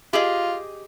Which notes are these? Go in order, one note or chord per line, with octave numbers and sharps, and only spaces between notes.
F4 G4 G#4 D#5